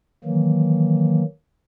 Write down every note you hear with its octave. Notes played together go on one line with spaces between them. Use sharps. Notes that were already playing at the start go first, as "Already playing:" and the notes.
D#3 E3 F#3 A#3